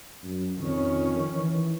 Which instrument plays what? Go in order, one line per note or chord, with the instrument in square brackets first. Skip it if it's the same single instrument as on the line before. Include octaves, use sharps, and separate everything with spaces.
[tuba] F#2
[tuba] F2 [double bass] D#3 C#4
[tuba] E3